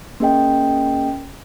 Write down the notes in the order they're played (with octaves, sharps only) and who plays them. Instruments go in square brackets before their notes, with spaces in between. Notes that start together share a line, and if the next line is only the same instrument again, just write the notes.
[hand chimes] A#3 C#4 G#4 D#5 G5